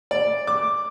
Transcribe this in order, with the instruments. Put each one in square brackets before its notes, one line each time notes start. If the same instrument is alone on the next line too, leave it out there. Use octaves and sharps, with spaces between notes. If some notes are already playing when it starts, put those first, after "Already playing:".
[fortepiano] D5
D6